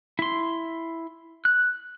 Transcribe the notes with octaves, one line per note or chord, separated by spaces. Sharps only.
E4 C6
F#6